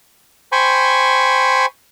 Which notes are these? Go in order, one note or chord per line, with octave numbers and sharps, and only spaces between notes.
C5 G5 G#5 B5 C#6